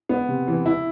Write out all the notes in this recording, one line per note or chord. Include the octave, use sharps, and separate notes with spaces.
B3
C3
E3
E4